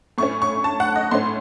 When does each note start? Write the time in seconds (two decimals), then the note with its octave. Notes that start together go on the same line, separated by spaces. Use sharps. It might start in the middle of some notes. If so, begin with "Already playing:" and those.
0.18 A2 A3 C#4 C#6
0.42 C#6
0.64 A5
0.80 F#5
0.96 D#5
1.11 A2 A3 C#4 C6